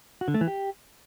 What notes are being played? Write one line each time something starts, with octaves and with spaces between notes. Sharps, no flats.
F#4
D3
A3
E3
G4